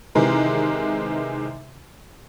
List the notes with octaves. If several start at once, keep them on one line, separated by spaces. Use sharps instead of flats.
C3 D#3 E3 G#3 A#4